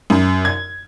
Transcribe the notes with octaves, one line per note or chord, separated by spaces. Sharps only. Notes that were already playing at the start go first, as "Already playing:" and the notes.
F#2
G#6